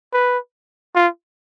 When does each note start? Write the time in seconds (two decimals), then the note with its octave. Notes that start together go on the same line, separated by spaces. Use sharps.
0.13 B4
0.95 F4